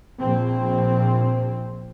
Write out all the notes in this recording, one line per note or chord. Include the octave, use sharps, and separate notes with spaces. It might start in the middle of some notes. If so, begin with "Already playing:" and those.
A#1 C4